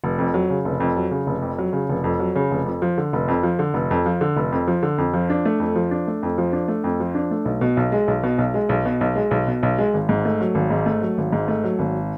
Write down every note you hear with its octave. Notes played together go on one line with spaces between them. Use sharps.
F1
F2
F#3
C#3
F1
F2
F#3
C#3
F1
F2
F#3
C#3
F1
F2
F#3
C#3
F1
F2
F3
D3
F1
F2
F3
D3
F1
F2
F3
D3
F1
F2
F3
D3
F2
F3
D4
A3
F2
F3
D4
A3
F2
F3
D4
A3
F2
F3
D4
A3
B1
B2
B1
G#3
B1
B2
B1
G#3
B1
B2
B1
G#3
B1
B2
B1
G#3
G#1
G#2
A3
F#3
G#1
G#2
A3
F#3
G#1
G#2
A3
F#3
G#1